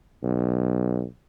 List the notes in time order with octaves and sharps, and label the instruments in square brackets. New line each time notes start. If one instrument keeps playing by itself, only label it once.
[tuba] B1